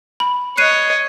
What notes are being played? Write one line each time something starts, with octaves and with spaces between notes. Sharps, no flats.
B5
C#5 D#5 F#6 C7 D#7